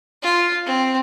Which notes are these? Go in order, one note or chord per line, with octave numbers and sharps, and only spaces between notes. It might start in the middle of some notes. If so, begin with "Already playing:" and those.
F4
C4